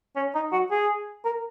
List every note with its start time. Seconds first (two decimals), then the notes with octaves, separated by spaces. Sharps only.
0.16 C#4
0.35 D#4
0.52 F#4
0.71 G#4
1.25 A#4